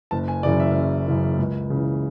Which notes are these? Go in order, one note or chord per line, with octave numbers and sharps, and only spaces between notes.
F#1 A5
G#5
F#2 C#3 E3 D5
E5
F#1
F#2 C#3 E3
C#2
C#3 E3